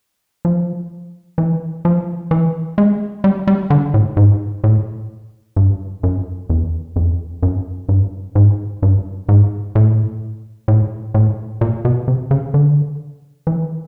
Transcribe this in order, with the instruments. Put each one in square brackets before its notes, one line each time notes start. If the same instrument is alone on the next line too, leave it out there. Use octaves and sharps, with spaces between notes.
[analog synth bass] F3
E3
F3
E3
G#3
G3
G3
D3
A2
G#2
A2
G2
F#2
E2
F2
F#2
G2
G#2
G2
G#2
A2
A2
A2
A#2
B2
C3
C#3
D3
E3